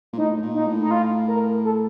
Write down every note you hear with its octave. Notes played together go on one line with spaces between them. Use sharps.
A#2
A2 D#4
A2
A#2
D#4
A2
D#4
F4
A#4
A4